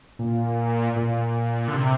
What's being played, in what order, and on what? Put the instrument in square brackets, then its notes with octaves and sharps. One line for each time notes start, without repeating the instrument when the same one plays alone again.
[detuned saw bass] A#2
A#2
D3
C3